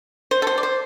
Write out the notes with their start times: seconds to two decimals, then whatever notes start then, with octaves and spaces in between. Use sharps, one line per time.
0.31 C5
0.42 A4
0.47 C5
0.58 D5
0.63 C5